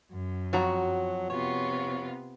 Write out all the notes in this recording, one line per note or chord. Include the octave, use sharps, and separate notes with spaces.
F#2
F2 F#3 F#4 A#5
C3 B3 F4 C#5